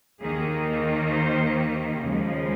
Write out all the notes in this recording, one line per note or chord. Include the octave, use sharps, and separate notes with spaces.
D#2 D#3 A#3 G#4
C5
D#2 C#3 F3 G#3